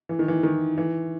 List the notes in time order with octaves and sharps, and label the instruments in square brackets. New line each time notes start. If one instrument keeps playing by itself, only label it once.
[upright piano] E3
D#3
E3
D#3
E3